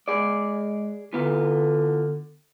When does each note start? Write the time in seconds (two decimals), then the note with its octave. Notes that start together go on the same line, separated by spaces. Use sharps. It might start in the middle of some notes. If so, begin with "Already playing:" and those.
0.08 G#3 G#4 D5
1.13 D3 E3 B3 F4